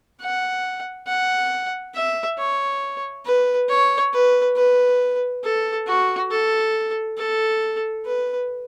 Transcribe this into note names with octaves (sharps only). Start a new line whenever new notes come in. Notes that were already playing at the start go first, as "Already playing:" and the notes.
F#5
F#5
E5
C#5
B4
C#5
B4
B4
A4
F#4
A4
A4
B4